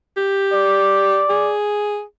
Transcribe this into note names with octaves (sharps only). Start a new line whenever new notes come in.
G4
D5
G#4